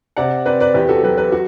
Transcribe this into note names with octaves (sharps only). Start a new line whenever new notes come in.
C3 D5 F#5
C4 B4 D5
B4 D5
E2 G4 B4
F#4 A4
F#3 G4 B4
G4 B4
F#4